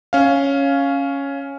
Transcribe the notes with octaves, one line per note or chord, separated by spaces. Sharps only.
C#4 F5